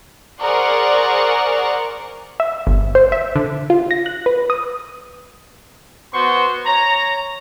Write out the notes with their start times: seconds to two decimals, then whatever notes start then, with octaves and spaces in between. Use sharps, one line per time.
0.42 G#4 A#4 C5 D5 F#5 C#6
2.40 E5
2.67 G1
2.95 C5
3.12 E5
3.35 D3
3.70 F4
3.91 A#6
4.06 F#6
4.26 B4
4.50 D#6
6.12 B3 F#4 C5 C6 C#6
6.66 C#5 A#5